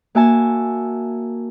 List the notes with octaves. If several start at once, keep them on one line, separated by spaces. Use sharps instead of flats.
A#3 F#4 E5 G#5 A5